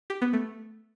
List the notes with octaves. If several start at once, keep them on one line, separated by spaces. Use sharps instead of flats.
G4
B3
A3